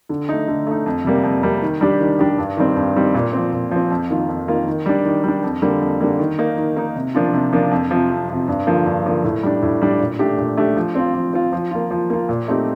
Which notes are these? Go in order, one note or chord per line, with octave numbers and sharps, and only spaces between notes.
D3
A3 D#4
D3
A3 D#4
F2
C3 G3 A#3
F2
C3 G3 A#3
D#3
G3 D4 G4
D#3
G3 D4 G4
G2
D#3 G3 C4
G2
D#3 G3 C4
A#2
F3 C4
A#2
F3 C4
F2
D#3 A#3 F4
F2
D#3 A#3 F4
D#3
G3 D4
D#3
G3 D4
F2
D3 G3 A#3
F2
D3 G3 A#3
D#3
A#3 D#4
D#3
A#3 D#4
C3
F3 A#3 D4 F4
C3
F3 A#3 D4 F4
F2
C3 F3
F2
C3 F3
G2
D3 F3 A#3
G2
D3 F3 A#3
A2
G3 D4
A2
G3 D4
A#2
A3 D4 G4
A#2
A3 D4 G4
F3
C4 F4
F3
C4 F4
F3
A#3 F4
F3
A#3 F4
A#2
A3 C4 D#4 G4